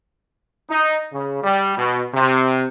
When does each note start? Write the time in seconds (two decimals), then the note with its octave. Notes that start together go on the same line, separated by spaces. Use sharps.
0.69 D#4
1.12 C#3
1.43 G3
1.76 B2
2.13 C3